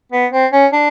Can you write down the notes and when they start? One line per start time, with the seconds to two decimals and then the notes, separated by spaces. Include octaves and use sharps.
0.12 B3
0.32 C4
0.52 C#4
0.73 D4